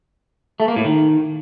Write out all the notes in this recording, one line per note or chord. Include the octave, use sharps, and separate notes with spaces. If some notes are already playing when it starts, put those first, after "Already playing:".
A3
A#3
A2
D#3